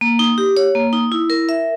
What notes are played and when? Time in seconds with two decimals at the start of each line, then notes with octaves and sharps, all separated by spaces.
0.01 A#3
0.19 D#4
0.38 G4
0.57 C#5
0.75 A#3
0.93 D#4
1.12 E4
1.30 A#4
1.49 E5